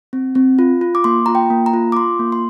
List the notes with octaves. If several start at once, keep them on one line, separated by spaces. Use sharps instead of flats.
C4
C4
F4
F4
D6
A#3 C6
F4 A#5
G5
A#3
A#5
F4
D6
F4 C6
A#3
C6